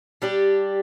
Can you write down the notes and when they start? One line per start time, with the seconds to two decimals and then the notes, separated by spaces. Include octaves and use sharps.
0.22 G3 D4 G4